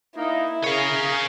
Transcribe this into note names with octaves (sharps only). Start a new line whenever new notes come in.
A#3 D#4 E4
C#3 G#4 A#4 C#5 F5